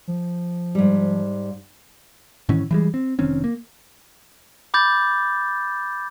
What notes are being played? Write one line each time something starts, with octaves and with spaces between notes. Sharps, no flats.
F3
G#2 G3
G#2 D#3 E3 C#4
E3 G3 G#3
C4
F1 D#3 C4 C#4
A#3
B5 D6 G6 A6